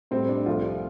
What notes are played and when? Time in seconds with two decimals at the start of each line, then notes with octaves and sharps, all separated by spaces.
0.11 A2 G3 C4
0.29 D4
0.46 C2 C3 F3 A3 F4